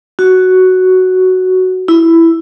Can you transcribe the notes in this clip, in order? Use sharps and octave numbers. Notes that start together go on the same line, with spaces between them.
F#4
E4